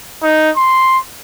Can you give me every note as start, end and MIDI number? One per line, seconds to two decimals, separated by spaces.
0.23 0.50 63
0.57 0.98 84